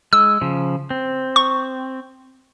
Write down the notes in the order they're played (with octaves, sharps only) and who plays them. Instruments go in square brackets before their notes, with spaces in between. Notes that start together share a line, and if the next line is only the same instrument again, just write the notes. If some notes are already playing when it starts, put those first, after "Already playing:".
[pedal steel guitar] G#3 [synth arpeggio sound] E6
[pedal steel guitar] C#3 F3
C4
[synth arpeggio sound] C#6